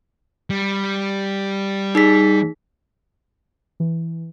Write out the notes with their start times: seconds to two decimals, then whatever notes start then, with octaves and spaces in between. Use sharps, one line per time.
0.50 G3
1.95 D#4 G#4 B6
3.80 E3